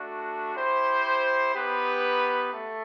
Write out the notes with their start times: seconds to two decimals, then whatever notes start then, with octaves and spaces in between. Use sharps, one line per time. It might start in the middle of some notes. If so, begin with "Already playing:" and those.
Already playing: A3 D4 F#4
0.54 E4 G4 C5
1.54 B3 D#4 G4 B4
2.53 A3